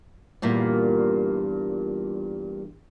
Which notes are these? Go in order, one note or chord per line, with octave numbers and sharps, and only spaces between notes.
E2 G2 A#2